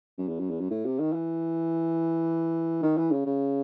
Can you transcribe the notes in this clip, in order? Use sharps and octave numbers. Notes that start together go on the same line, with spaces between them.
F#2
E2
F#2
E2
F#2
A2
C3
D#3
E3
D#3
E3
C#3
C#3